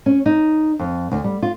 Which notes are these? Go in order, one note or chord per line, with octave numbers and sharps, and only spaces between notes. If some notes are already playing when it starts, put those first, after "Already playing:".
C#4
D#4
F2
D2
G3
F4